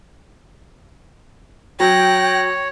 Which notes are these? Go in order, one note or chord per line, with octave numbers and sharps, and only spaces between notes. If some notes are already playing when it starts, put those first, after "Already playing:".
F#3 C#5 G5 F#6 A#6